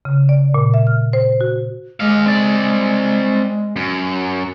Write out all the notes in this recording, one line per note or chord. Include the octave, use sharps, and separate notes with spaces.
C#3
D5
A#2
E5
F6
C5
F#4
G#3 D#5 F5
C4 D5
F#2